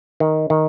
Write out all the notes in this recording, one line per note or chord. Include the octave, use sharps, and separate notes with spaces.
D#3
D#3